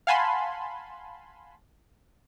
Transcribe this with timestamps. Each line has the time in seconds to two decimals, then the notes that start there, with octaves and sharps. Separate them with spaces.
0.07 F5 F#5 G#5 A5 B5 C6